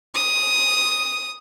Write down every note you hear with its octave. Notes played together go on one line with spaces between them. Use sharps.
D#6